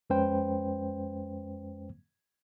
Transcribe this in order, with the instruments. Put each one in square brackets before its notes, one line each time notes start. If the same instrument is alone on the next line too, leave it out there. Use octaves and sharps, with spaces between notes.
[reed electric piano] F2 G#3 C#4 B4 C5 G5